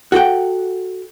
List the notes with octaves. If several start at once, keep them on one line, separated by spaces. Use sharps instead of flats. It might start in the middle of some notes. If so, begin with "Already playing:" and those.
F#4 A4 F#5 G5